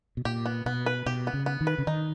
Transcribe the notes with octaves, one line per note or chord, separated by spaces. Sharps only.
B2
A#2 G4
B3
B2 B3
B4
B2 G4
B3
C#3
B3
D#3
B4
C#3
D#3 D#4